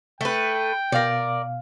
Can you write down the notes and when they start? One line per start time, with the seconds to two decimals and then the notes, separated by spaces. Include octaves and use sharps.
0.21 A3 B4 G5
0.92 B2 A#4 D5 F5